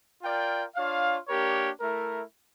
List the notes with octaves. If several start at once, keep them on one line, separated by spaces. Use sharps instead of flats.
F4 A#4 D5 G5
D4 F4 C#5 F5
A#3 D4 G4 A#4 C#5
A3 E4 A#4